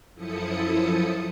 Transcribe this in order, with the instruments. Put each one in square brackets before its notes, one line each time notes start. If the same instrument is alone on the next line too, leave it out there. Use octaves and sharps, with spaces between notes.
[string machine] F#2 F3 E4 A4 D#6 C#7